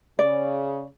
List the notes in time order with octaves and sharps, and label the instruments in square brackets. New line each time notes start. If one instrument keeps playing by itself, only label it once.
[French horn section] C#3 [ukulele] D5